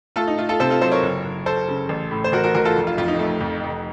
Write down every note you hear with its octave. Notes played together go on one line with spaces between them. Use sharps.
A3 F4 A4
D#4
A3 F4
F4 A4
C3 A4 C5
F4 A4
F#3 A4 C5
A#4 C#5
F#1
F#1
F#1 A4 C5
C#3
A1
A2
C5
A1 F#4 A#4
F#4 A#4
A1 F#4 A#4
F4 A4
F1
F4
F2 F4
D#4
A3
F2
F1